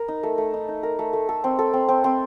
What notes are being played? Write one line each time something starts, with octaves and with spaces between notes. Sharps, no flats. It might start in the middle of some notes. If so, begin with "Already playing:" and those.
Already playing: A#4
D#4
A3
A3
D#4
D#4
A#4
A3
A3
A4
C4
A4
C4
C4
C4